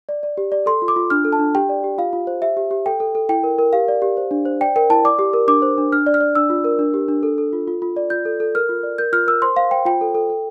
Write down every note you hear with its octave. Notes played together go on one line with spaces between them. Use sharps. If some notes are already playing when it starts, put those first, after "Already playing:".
D5
D5
G4
D5
A4 C6
F4
D6
F4
D4 F6
A4
A5
D4
G4 G5
D5
G4
F4 F5
F4
C5
G4 E5
G4
G4
A4 G5
A4
A4
E4 G5
A#4
A#4
G4 F5
D5
G4
C5
D4
C5
D5 G5
A#4 G5
E4 A5
D5 D6
G4
A#4
D4 D6
C5
D4
D4 F6
D5
F6
D5
D4 E6
F4
A#4
D4
G4
D4
A4
A4
F4
F4
F4
D5
F4 G6
A4
A4
A#4 F6
F4
D5
A#4 G6
F4 F6
A#4 E6
C5 C6
C5 F5
C5 G5
F4 G5
A4
A4
A4